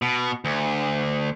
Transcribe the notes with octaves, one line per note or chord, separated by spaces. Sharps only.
B2
D2